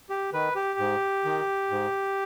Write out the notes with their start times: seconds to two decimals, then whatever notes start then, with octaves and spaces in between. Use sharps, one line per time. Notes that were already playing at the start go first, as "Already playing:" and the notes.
0.10 G4
0.33 D#3 B4
0.56 G4
0.79 G#2
1.25 D#3
1.71 G#2